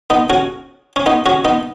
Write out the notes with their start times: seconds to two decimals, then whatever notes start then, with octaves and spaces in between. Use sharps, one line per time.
0.10 B3 D#4
0.30 C#4 F#4
0.96 C#4
1.06 B3 D#4
1.26 C#4 F#4
1.45 B3 D#4